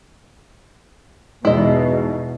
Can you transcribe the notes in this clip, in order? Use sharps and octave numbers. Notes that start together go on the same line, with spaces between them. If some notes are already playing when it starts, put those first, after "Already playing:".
E2 G#2 B2 E4 D#5